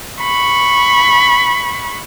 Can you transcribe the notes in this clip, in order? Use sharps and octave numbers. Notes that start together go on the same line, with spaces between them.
B5 C#6